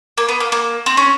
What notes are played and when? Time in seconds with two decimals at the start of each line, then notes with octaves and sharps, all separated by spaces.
0.18 A#3
0.29 B3
0.40 A#3
0.52 A#3
0.86 C4
0.97 C#4